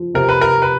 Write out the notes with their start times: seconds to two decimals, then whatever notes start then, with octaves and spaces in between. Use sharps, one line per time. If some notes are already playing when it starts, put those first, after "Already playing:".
Already playing: F3
0.14 C3 A#4
0.29 B4
0.41 A#4
0.62 B4